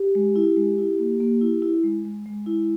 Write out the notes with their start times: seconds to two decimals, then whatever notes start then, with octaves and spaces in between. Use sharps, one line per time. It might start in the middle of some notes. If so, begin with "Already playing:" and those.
Already playing: G4
0.15 G#3
0.36 E4
0.57 G#3
0.78 E4
0.99 A#3
1.20 A#3
1.41 E4
1.62 E4
1.84 G#3
2.05 G#3
2.26 G#3
2.46 E4